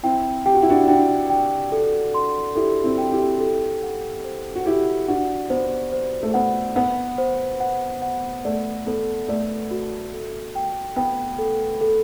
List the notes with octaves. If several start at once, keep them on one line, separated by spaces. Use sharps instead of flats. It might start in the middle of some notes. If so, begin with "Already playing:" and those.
C4 E4 G5
G4 G5
F#4
E4
D4 F#4
D4 F#4 G5
G5
A4
C6
E4 G4 A4
C4 E4
G5
E4 G4
A4
F#5
C5
F#4
E4 G4 F#5
D4 F#4 F#5
B3 C5
C5
A3
B3 F#5
B3 F#5
C5
F#5
F#5
A3 D5
B3 A4
A3 D5
F#4
A4
G5
B3 G5
A4
A4